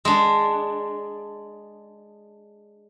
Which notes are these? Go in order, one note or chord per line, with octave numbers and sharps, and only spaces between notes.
G#3 D4